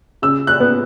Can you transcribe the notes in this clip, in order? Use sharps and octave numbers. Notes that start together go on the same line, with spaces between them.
C#3 E6
F#6
B3